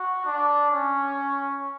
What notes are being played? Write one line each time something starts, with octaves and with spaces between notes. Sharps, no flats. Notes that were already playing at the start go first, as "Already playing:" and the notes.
Already playing: F#4
D4
C#4